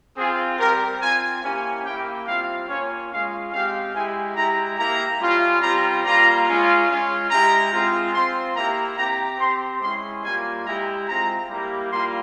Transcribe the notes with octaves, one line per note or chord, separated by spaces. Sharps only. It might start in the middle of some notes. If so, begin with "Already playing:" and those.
C4 F4 G#4
G3 C4 G4 A#4
C4 F4 G#5
A#3 C#4 E4 G4 G#5
A#3 E4 G4 G5
G3 C4 F4 F5
A#3 C#4 F4 C#5
G#3 C#4 F4 F5
G#3 C4 G4 F5
G#3 E4 G4 G#5
G#3 E4 G4 A#5
A#3 E4 G4 A#5
G3 C#4 F4
G3 C4 F4 A#5
G3 A#3 F4 A#5
G#3 C#4 F4
G#3 C#4 F4
G#3 E4 G4 A#5
G#3 C4 F4
C4 F4 C6
A#3 E4 G4 A#5
C4 G4 A#5
C4 G4 C6
G#3 C#4 E4 C6
G3 A#3 F4 G#5
G#3 E4 G4 A#5
G#3 C4 F4 A#5
G3 A#3 E4 G4
G3 A#3 F4 C6